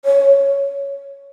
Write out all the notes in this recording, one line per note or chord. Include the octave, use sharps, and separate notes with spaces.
C#5